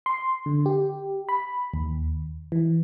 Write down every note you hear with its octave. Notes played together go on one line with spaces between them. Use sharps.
C6
D3
G4
B5
D#2
E3